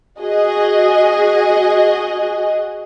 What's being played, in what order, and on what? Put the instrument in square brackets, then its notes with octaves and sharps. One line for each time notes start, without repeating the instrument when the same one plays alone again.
[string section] F#4 G#4 D#5